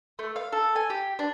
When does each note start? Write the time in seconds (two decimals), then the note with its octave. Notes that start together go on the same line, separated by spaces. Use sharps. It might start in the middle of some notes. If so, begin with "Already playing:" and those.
0.19 A3
0.36 F5
0.52 A4
0.76 G#5
0.90 G4
1.19 D4